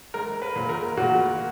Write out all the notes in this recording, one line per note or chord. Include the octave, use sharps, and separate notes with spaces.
G#3 A#4
B4
A#2
A#4
A#2 F#4